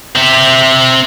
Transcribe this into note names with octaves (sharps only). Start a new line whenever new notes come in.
C4 E5